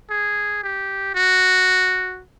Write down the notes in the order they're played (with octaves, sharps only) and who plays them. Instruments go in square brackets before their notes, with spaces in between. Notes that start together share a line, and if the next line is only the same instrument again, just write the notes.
[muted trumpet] G#4
G4
F#4